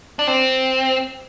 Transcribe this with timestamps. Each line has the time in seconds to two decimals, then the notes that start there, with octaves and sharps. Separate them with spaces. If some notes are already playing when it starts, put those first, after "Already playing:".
0.19 D4
0.27 C4